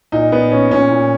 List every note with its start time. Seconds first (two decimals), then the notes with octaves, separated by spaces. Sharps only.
0.12 A#2 D#4
0.32 A#2 B3
0.52 A#2 C#4
0.71 A#2 C#4
0.91 A#2